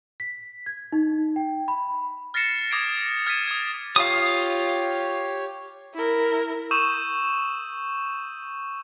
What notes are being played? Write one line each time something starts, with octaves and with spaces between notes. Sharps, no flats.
B6
G#6
D#4
G5
B5
F6 A6 A#6 C7 C#7 E7
D6 D#6 G#6 A#6 C7 D7
F6 G#6 A6 B6 D#7 E7
D#6 G#6
F4 G4 C#5 F5 D#6
E4 A#4
C#6 D#6 E6 G6 D#7 E7